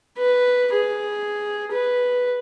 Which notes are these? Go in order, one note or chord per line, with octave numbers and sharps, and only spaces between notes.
B4
G#4
B4